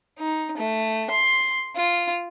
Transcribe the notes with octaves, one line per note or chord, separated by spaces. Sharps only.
D#4
A3
C6
F4